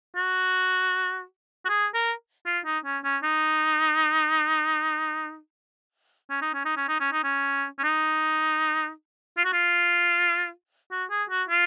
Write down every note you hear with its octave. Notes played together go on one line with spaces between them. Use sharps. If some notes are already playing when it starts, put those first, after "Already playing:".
F#4
F#4
G#4
A#4
F4
D#4
C#4
C#4
D#4
C#4
D#4
C#4
D#4
C#4
D#4
C#4
D#4
C#4
C#4
D#4
F4
F#4
F4
F#4
G#4
F#4
F4